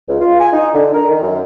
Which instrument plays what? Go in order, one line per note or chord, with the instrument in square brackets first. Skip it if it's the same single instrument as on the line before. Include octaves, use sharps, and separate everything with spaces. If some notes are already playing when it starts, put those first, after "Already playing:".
[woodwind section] C#2
F4
G#5
D#4
D3
A#4
D#3
F#2